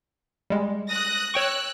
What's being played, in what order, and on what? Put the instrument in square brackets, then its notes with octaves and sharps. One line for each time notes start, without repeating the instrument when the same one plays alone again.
[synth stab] G3 G#3
[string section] D#6 F#6 A#6
[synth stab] C#5 G5 C#6 [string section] E6 F#6